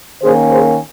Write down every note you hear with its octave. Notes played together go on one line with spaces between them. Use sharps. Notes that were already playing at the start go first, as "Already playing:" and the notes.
D#3 A#3 C#4 G#4 C5
G#4 C5